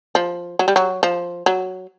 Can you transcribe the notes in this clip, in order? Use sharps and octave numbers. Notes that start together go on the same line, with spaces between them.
F3
F#3
G3
F#3
F3
F#3